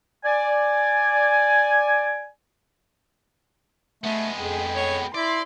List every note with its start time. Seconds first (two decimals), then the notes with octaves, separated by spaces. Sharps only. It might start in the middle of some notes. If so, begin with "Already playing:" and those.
0.25 D5 G#5
4.04 G#3 A3 B3
4.39 F2 G#4 G5
4.75 C#5
5.14 E4 D5 C6